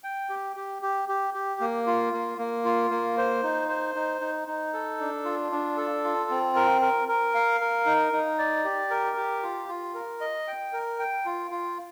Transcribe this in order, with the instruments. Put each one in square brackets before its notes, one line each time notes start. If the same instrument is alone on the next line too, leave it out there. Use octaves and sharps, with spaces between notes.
[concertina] G5
G4
G4
G4
G4
G4
A#3
F4
A#3
A#3
F4
A#3
C5
D#4
C5
D#4
D#4
D#4
A4
D4
F4
D4
A4
F4
C4
A#4
A#4
A#4
F5
A#4
D#4
D#4
D5
G4
A#4
G4
F4
F4
A#4
D#5
G5
A#4
G5
F4
F4